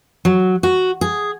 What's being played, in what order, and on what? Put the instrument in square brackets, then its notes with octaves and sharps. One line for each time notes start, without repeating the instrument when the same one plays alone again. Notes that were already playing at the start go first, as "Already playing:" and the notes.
[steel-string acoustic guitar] F#3
F#4
G#4